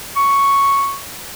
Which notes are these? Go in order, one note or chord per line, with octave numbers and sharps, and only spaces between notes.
C#6